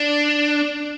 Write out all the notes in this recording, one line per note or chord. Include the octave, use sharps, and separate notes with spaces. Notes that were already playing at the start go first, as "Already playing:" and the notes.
Already playing: D4